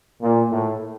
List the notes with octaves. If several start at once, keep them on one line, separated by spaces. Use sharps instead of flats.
A#2
A2